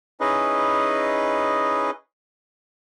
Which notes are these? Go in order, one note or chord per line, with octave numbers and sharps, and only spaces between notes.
C#4 D#4 E4 G#4 B4 D#5